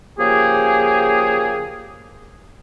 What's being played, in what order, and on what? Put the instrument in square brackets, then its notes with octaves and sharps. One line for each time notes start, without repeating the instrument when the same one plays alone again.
[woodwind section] C#3 F3 A#3 G4 G#4